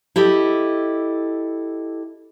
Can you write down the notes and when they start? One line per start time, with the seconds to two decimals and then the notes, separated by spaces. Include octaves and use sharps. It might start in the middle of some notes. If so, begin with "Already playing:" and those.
0.16 E4 G4 A4 D#5